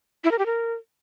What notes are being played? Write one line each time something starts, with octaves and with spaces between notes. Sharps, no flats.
E4
A#4
G4
A#4